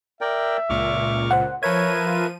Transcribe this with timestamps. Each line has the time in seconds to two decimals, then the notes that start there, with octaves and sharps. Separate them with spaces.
0.21 A#4 D5 E5 G5
0.70 C#2 A#2 C#6 D6 F6
1.31 C5 F#5
1.63 F3 A#4 B4 C#5 E5 G#6 D#7
2.06 F4